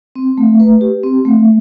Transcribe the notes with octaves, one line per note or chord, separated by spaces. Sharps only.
C4
A3
B4
G4
C4
A3